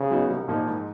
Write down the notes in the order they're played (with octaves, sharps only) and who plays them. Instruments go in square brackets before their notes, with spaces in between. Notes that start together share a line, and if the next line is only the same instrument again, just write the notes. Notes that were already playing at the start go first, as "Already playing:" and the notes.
Already playing: [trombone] C#3
[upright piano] F#3 B3 D#4 F#4
C2
A#2 F3 A#3 D#4
G#2